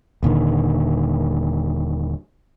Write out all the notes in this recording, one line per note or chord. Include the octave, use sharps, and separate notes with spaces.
D#1 A#2 D3 D#3